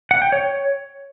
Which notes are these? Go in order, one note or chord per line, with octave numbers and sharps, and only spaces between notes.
F#5
G5
C#5